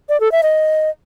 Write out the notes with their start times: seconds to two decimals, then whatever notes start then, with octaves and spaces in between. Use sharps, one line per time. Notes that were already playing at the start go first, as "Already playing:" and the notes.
0.09 D5
0.20 A4
0.32 E5
0.43 D#5